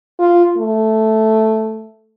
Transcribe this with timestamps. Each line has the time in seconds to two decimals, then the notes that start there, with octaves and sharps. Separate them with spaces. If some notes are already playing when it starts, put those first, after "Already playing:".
0.19 F4
0.58 A3